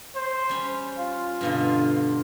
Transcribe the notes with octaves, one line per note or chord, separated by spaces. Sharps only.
C5
G3 C#4
F4
G2 B2 D3